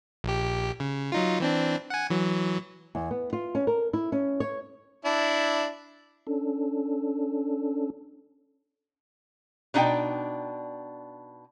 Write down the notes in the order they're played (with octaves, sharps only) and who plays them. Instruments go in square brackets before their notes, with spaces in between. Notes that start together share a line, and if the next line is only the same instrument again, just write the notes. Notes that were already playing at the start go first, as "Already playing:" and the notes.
[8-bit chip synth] A#1 G4
C#3
F#3 D#4 F4
E3 C4 D4
F#5 G#5
E3 F#3
[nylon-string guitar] E2
B3
F4
C#4
A#4
E4
C#4
C#5
[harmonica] D4 E4
[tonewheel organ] C#4 D4 A4
[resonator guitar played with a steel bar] B2 D4 D#4 D5 E5 G5